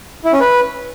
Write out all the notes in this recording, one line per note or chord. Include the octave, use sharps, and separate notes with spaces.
E4
C#4
B4